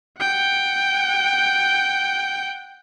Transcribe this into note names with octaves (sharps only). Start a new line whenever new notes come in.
F#5 G5